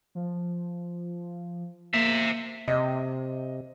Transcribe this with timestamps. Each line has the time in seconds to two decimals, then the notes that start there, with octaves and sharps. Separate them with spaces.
0.15 F3
1.94 A#3 C5 E5
2.68 C3 D#5